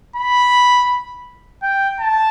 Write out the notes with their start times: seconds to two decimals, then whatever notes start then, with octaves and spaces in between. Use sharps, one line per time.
0.16 B5
1.63 G5
2.00 A5